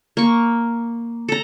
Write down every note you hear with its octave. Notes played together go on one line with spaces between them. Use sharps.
A#3 C#6
A4 A#5